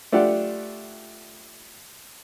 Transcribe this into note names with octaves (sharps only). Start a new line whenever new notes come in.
A3 D4 F4 G4 F#5